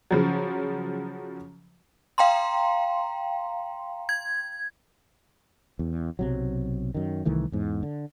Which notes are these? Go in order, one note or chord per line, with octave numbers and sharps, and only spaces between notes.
C#3 F3 F#3
F5 G5 A#5 C6
G#6
E2
B1 C3 F#3
F#2 D#3
C2 D#3 E3 A3
E2 G#2
D3